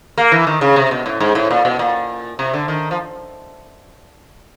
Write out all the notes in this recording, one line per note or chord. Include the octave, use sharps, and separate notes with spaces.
A#3
E3
D#3
C#3
C3
B2
A2
G#2
A2
A#2
B2
A#2
C3
D3
D#3
F3